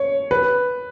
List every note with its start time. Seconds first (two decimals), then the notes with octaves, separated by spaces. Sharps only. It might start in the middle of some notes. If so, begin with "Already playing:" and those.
Already playing: C#5
0.31 B4